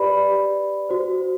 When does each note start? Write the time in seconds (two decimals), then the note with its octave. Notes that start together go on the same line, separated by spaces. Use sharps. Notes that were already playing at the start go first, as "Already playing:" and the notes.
Already playing: G4 B4 D5 B5
0.89 F#4 C5